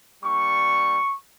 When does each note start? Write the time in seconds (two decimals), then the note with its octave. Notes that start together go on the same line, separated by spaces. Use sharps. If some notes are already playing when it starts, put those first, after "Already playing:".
0.23 G3 A#3 D4 C#6